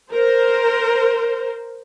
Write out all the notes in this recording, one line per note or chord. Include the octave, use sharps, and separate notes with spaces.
A#4 C5